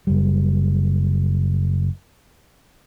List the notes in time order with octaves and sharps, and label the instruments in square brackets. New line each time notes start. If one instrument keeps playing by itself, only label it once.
[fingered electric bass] F#1 G3